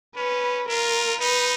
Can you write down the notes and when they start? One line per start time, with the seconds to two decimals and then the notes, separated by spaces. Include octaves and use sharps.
0.16 C#4 B4
0.69 F4 A#4
1.21 D#4 B4